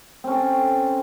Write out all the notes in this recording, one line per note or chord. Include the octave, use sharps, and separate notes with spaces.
C4 C#4 A4